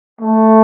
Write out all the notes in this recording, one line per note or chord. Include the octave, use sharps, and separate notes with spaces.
A3